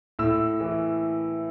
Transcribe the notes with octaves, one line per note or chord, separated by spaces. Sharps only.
A2 E6
E3